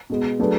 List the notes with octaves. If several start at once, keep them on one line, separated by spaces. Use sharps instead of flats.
B2 G#3 B3
F#3 A3 D4 G#4 B4